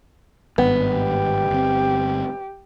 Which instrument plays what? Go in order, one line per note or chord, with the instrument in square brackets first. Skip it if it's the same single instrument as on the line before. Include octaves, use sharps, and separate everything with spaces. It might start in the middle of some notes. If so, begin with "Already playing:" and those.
[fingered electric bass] G#1 G2 [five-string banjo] B3
[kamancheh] G4
[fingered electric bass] G1 C4